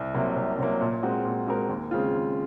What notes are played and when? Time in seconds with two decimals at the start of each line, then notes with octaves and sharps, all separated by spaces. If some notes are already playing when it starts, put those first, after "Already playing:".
Already playing: C2
0.14 C3 F#3 A#3
0.36 C2
0.59 C3 F#3 A#3
0.81 A#2
1.03 G#3 C4 F#4 A#4
1.25 A#2
1.47 G#3 C4 F#4 A#4
1.69 D#2
1.91 C#3 G#3 C4 F4
2.14 D#2